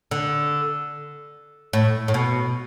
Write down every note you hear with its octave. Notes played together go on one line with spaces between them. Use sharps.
D3
A2
A2
B2